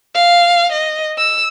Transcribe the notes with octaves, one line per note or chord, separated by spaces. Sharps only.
F5
D#5
E6